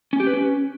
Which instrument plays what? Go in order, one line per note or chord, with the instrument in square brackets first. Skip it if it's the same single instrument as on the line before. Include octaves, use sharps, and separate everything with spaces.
[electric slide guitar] C#4
G4
B4
C#4